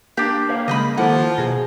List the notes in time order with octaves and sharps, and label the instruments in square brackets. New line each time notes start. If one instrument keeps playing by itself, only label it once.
[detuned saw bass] A#3 [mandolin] D4 G4
[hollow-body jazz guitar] B4 C#5 F5
[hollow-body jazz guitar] C#3 F#3 G#3 [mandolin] D#5 G5 B5
[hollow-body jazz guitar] D#2 E4 A4 [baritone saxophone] F3 [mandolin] F#5
[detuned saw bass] B2 [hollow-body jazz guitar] G#4 A#5